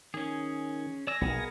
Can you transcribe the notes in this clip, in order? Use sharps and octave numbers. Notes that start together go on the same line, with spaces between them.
D#3 C#4 G#4
D5 G#5 E6 A#6
B1 B2 B3 G#4 A#4